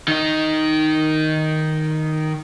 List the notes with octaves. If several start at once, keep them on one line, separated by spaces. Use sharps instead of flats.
D#3 D#4